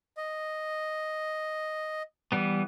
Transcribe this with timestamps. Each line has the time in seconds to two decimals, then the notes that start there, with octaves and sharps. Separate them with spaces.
0.17 D#5
2.32 E3 G3 B3